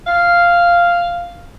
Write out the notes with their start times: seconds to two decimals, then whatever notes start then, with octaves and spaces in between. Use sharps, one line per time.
0.07 F5